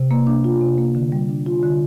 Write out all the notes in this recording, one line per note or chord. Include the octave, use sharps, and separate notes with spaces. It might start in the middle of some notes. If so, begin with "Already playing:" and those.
Already playing: C3
A#3
D4
F4
C3
A#3
D3
G3
D4
F4
D3